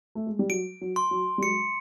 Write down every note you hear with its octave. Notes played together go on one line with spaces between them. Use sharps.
A3
G#3
G3
F#3 D7
F#3
C6
F#3
G3
F#3 G#3 C#7